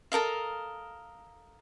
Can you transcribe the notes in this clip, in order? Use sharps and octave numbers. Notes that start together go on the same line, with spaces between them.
A4 A#4 D#5 F5